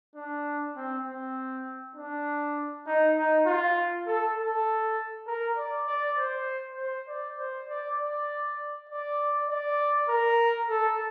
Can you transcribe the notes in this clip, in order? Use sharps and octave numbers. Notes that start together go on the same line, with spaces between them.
D4
C4
C4
D4
D#4
D#4
F4
A4
A4
A#4
D5
D5
C5
C5
D5
C5
D5
D5
D5
D5
A#4
A4